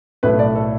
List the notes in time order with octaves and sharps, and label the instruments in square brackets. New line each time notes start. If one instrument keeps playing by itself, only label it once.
[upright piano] B1 A2 A3 B4
D5
A4